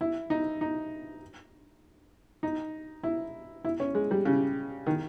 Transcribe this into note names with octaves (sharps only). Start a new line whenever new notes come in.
E4
D#4
D#4
D#4
E4
E4
C#4
G#3
G3
C#3
D#3